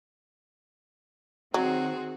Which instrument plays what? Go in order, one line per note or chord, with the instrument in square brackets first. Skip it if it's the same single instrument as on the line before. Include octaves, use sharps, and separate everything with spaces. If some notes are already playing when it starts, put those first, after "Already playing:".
[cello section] D#3 C4 [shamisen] F#3 [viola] F#4 G#4